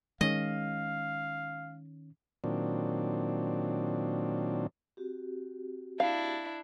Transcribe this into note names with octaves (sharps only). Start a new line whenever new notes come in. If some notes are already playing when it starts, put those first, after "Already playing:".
D#3 G#3 C#4 D#5 F5
A#2 D#3 F#3 C4 D4
C4 F#4 G4
D4 E4 F5